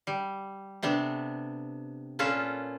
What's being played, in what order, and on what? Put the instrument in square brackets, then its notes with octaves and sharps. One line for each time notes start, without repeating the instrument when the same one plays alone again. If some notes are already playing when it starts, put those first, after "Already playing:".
[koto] G3
C3 B3 D4 A4
A#2 C#4 F4 A4 B4